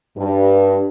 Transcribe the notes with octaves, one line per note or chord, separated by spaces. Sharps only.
G2